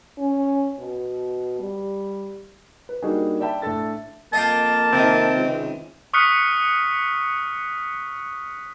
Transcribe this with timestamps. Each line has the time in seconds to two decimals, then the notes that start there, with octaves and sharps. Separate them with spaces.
0.18 C#4
0.80 B2
1.60 G3
2.89 B4
3.02 G3 A#3 D4 D#4 F#4 G#4
3.40 D5 E5 G5 A5 B5
3.62 A2 A3 D4 A4 A6
4.33 F2 A#3 D#5 F5 G5 A5
4.93 C3 D#3 C4
5.33 C#2
6.14 C#6 D#6 F6 F#6 B6 C#7